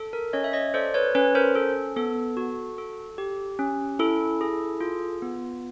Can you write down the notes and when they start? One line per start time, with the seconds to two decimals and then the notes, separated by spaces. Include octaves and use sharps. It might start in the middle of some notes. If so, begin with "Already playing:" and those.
Already playing: A4
0.13 A#4
0.33 C#4 C#5 D#5
0.44 E5
0.53 C#5 D#5
0.74 A4 C5 D5
0.94 B4 C#5
1.15 C#4 B4 C#5
1.35 A#4 C5
1.55 A4
1.96 B3 A4
2.37 F#4
2.78 A4
3.18 G4
3.59 C#4
3.99 E4 A4
4.41 G#4
4.81 F4
5.22 B3